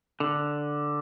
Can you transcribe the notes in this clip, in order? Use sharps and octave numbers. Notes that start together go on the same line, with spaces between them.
D3